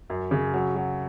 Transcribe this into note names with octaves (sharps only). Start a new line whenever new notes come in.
F#2
C#3
F#3
F#3